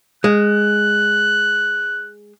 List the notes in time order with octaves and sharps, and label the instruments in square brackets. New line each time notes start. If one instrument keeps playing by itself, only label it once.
[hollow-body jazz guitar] G#3 [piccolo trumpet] F#6